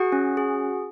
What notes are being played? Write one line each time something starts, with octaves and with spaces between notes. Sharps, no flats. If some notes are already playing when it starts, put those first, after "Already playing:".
Already playing: F#4 G#4 F#5
C#4
G#4